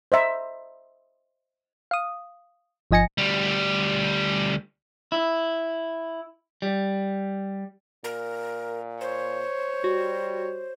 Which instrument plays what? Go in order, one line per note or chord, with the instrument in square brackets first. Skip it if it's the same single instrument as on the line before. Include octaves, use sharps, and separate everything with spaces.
[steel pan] C5 D#5 E5 A#5
[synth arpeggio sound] F5 D#6
G1 F3 D#5 G#5 A#6 C#7
[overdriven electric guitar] D2 G3
[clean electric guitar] E4
G3
[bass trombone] A#2 [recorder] A#4
[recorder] C5 [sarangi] C#5
[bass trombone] G3 [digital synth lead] F#4